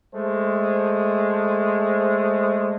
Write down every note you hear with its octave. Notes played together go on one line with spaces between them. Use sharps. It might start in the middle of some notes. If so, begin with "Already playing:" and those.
G#3 A3 C5